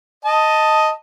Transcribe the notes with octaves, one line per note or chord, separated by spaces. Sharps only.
D#5 A5